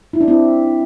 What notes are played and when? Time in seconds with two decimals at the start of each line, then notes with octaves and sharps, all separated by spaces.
0.13 E4
0.21 D4
0.28 C4 E4